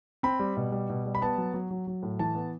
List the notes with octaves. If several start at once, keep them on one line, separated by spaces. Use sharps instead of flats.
C4 B5
G3
B2
G3
B2
G3
B5
B3 A5
F#3
F#3
F#3
F#3
A2
E3 A5
B3